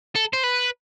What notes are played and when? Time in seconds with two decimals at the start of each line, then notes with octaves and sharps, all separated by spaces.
0.15 A4
0.33 C5
0.44 B4